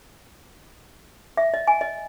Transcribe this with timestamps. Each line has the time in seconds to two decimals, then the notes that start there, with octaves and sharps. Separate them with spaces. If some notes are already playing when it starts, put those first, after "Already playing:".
1.37 E5
1.54 D#5
1.67 G#5
1.81 D#5